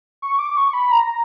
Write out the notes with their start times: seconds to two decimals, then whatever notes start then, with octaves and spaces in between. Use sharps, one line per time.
0.22 C#6
0.39 D6
0.57 C#6
0.73 B5
0.91 A#5